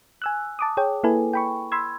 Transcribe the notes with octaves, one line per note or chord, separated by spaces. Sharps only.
G#5 E6 F#6
A5 D6 D#6
G#4 C#5 G5
A#3 E4 A4 B4 G#5
G5 B5 C#6
B5 C6 E6 G#6